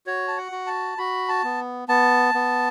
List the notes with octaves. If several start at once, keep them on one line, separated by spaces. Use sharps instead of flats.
F#4 C#5
A5
F#5
F#4
A5
F#4 B5
A5
B3
B3 A5
B3